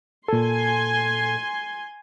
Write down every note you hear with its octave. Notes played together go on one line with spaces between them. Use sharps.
A#2 A4 G#5 C6